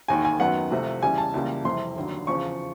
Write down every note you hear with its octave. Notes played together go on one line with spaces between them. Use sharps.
E1 D#2 D#3 G#5
G#5
F#2 D#3 F#3 B3 F#5
C2 C3 F3 A3
E2 C#3 E3 G3 G#5
A5
C#2 C#3 E3 G3 A#3
F2 C3 E3 G3 C6
F1 D#2 D3 F#3
E2 C#3 F3 C#6